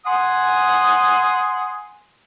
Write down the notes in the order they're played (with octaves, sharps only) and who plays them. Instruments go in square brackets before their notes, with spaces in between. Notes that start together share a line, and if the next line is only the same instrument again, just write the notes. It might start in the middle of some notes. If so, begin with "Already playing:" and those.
[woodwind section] F#5 G#5 C6 D#6